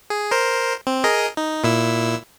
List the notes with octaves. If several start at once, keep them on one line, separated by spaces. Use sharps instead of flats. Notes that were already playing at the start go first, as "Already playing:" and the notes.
G#4
A#4 C5
C4
G#4 A#4 D#5
D#4
A#2 E4 E6